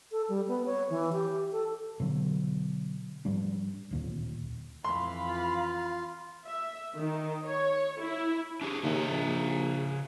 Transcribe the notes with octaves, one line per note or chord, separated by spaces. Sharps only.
A4
G3
B3
C#5
E3
G4
A4
B2 D3 F3 F#3
G#2 F3 G3 D4
D1 D#2 A#2
F2 E3 F5 B5 C6
F4
E5
D#3
C#5
E4
D4 G4 G#4
D#2 C#3 G#4 E5
A#1